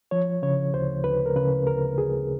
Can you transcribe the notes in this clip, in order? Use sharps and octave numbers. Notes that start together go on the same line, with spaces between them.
F3 C#5
C#3 C#5
D2 C5
D2 B4
A#4
C#3 B4
D2 A#4
D2 G#4